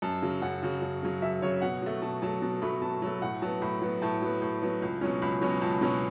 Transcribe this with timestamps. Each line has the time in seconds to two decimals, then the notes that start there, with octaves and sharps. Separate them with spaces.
0.02 F#2 A5
0.22 C#3 F#3
0.42 F#2 F#5
0.63 C#3 F#3
0.82 F#2
1.02 C#3 F#3
1.22 F#2 E5
1.42 C#3 F#3 C#5
1.62 B2 F#5
1.82 F#3 A3
2.02 B2 A5
2.22 F#3 A3 A5
2.42 B2 A5
2.62 F#3 A3 B5
2.82 B2 A5
3.02 F#3 A3
3.22 A2 F#5
3.42 F#3 B3 A5
3.62 A2 B5
3.82 F#3 B3
4.02 A2 A5
4.22 F#3 B3
4.42 A2
4.62 F#3 B3
4.82 C#2
5.01 B2 F#3 C#4
5.22 C#2 B5
5.41 B2 F#3 C#4
5.61 C#2 A5
5.81 B2 F#3 C#4